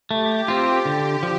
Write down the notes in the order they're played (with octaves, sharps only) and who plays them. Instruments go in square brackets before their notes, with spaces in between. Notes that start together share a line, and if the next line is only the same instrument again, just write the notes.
[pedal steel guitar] A3 [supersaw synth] G4
[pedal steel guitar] C4 F4
[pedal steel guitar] D3 [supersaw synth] G4
[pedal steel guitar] F3